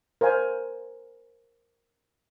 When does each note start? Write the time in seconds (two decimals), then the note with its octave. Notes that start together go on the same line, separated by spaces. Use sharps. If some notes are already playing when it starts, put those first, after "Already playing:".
0.21 A#4 C5 F5 G#5